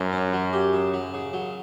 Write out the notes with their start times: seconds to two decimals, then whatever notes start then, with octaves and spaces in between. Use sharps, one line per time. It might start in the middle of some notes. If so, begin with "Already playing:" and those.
Already playing: F#2 F#3
0.13 C#4
0.33 F#3
0.53 G4
0.73 C#3
0.93 F#3
1.14 C#3
1.33 F#3